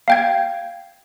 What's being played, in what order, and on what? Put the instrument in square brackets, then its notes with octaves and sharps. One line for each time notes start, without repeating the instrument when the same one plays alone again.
[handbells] F5 G5 G#6